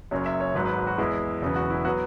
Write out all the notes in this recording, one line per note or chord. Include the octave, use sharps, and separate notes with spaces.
F#1 F#2 F#3 C#4 C#5
E5
C#5
G#1 G#2 F#3 B4
B4
F#4
E2 E3 G#3 E4
E1 E2 C#3 F#3 B3
F#4
E4
F#3 B3 F#4